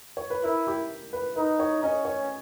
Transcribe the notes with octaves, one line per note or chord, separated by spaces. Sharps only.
C#5
B4
E4 A#4
G4
B4
D#4 B4
C#5
C#4 D#5
C#5